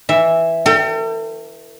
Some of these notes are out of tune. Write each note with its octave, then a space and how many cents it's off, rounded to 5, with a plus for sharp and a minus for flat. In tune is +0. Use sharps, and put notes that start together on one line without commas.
E3 +0 E5 +0
A4 +45 G5 +0